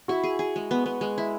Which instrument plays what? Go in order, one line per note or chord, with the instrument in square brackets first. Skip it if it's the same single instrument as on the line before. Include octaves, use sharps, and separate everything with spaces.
[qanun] E4 [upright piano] F#4
[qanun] G#4
G#4
G#3
B3
B3
G#3
E4